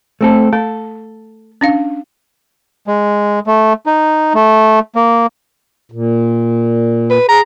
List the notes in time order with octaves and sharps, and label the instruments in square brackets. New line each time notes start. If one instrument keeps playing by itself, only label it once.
[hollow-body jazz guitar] A3 C4 A4
[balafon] A3 [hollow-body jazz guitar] A4
[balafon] C#4 D4 F5
[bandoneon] G#3
A3
D#4
A3
A#3
[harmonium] A#2
[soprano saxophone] B4
[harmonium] G#4 [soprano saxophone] A#5